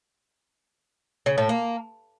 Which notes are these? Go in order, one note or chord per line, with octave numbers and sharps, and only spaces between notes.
C#3
A2
A#3